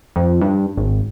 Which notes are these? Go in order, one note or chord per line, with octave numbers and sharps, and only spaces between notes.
F2
G2
G#1